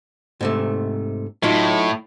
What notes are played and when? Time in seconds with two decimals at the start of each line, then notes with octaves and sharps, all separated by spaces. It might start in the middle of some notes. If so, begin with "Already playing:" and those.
0.41 G#2 C3 A3
1.43 A2 F#3 D#4 F4